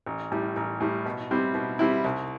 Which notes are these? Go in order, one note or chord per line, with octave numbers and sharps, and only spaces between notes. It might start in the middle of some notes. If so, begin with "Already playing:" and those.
A1
A2 G3
A1
A2 G3
B2
G3 C4 E4
B2
G3 C4 E4
C2